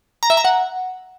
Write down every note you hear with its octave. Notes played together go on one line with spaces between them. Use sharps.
A#5
E5
A#5
F#5